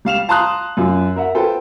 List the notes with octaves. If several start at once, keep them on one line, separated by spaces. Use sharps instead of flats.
G3 F5 E7 F7
F5 A5 A#5 C6 D#6 F#6
F#2 F4
A#4 E5 F#5
F4 A4 B4 C5 G5